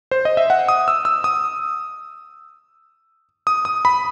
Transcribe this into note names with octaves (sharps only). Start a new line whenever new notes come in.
C5
D#5
E5
F#5
D#6
E6
E6
D#6
D#6
D#6
B5